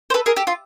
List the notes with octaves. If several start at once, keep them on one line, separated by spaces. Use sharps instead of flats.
C5
A4 B4
G#4 A#4
G4 A4
F4